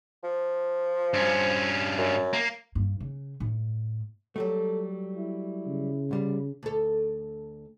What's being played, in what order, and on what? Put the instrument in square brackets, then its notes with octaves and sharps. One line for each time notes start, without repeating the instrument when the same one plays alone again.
[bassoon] F3
[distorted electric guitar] G2 C#4
[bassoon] F#2
[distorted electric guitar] A#3
[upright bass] G2
C#3
A2
[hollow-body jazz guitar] F#3 G3 A3 [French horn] A4
[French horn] E4
[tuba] C#3
[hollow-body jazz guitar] C2 G3 F4
[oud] D2 A4